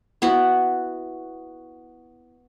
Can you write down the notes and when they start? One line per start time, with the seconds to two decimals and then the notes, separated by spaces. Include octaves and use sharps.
0.22 B3 E4 F#4